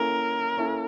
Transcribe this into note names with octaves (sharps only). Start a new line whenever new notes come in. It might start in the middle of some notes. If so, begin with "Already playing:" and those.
Already playing: A#3 C#4 E4 A4 A#4
A#3 C#4 E4 A4